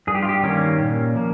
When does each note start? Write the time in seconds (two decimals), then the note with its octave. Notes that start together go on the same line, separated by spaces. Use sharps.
0.07 G2 G#4
0.15 G4
0.23 F4
0.29 G4
0.43 D#3 G3 A#3 C#4
0.79 A#2
1.15 F3 A#3